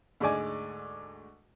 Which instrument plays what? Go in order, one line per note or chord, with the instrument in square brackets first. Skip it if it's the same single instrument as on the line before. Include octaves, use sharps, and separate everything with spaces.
[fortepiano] D2 G#2 G#3 D5 G#5